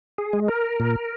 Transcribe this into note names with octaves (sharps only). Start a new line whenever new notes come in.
G#4
G#3
A#4
A#2